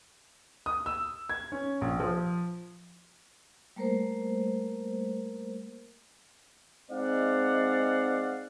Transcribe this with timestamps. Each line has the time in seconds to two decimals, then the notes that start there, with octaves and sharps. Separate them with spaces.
0.66 D#6
0.86 E6
1.29 G#6
1.52 C#4
1.81 A#1
2.00 F3
3.76 G3 A3 A#3 A#4 C5
6.91 G#3 C4 D#4 D5 F5 F#5